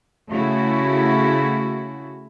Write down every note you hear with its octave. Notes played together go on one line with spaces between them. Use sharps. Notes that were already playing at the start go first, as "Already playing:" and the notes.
C#3 A3 E4 F#4